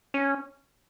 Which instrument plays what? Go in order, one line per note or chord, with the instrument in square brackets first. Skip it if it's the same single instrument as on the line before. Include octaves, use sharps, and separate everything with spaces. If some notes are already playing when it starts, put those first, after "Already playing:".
[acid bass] C#4